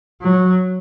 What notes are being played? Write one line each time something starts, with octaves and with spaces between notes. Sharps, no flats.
F#3